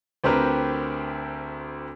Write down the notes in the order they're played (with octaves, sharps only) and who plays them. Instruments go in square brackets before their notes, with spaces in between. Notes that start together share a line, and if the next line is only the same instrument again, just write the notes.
[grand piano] D2 C4 G4 A#4 B4